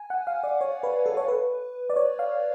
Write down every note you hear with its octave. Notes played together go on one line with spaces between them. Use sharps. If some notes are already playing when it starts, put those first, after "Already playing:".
Already playing: G#5
F#5
F5
D5
C#5
B4
A4
C#5
B4
D5
C#5
F5